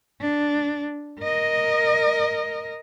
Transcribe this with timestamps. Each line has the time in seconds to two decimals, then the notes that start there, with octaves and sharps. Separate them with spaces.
0.21 D4
1.21 A#4 D#5